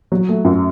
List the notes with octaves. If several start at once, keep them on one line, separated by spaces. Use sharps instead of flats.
F#3
A3
F#2